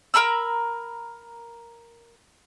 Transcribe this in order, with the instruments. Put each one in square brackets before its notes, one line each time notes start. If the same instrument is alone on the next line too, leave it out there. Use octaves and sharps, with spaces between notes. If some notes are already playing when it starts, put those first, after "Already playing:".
[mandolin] A#4 A#5 B5 E6